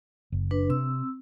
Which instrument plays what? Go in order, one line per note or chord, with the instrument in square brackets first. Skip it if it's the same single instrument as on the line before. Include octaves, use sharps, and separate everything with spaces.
[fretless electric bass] F#1
[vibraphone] D4 B4
[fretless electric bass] C3 [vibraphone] C4 E6